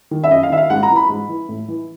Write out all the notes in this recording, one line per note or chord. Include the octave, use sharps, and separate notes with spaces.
D#3
E5
F#2 D#5
F5
D#3 E5
F5
G#2 F#5
A#5
E3
B5
G#2
E3
A2
E3